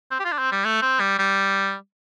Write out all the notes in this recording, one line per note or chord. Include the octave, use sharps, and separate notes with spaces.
C4
G4
F4
D4
C4
G3
A3
C4
G3
G3